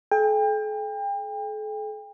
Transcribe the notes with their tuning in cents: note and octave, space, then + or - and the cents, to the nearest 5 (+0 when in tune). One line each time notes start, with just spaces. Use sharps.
A4 -45 G5 +35